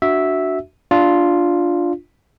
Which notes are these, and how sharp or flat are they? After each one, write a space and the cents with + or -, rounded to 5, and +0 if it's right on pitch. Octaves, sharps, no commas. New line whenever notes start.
D4 +0 F#4 +0 E5 -5
D4 +0 F4 +0